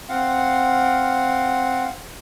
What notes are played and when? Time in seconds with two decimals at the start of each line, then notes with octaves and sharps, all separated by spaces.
0.09 C4 F5 F#5